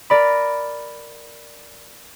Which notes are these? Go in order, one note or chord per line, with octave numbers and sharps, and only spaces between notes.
A#4 D5 B5